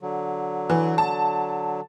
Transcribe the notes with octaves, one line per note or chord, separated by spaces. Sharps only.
D3 F#3
E3
A5